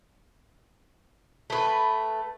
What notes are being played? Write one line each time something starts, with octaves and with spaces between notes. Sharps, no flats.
A3 B4